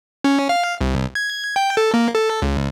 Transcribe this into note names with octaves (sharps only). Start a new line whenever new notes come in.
C#4
F5
C2
G#6
G5
A4
A#3
A4
C#2